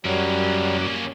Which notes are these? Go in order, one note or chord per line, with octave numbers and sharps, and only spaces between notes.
F#2 F#3 G3 A#3 C#4